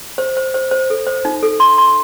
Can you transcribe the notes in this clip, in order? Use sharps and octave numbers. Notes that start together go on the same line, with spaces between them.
C5
C5
C5
C5
A4
C5
D#4
A4
C6
C6